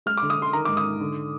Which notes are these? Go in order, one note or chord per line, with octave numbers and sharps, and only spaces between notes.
G#3 F6
D6
D3
D#6
D3
C6
D#3 A#5
D6
G#2
D#6
D#4
D3